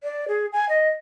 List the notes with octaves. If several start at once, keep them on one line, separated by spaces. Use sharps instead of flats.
D5
G#4
G#5
D#5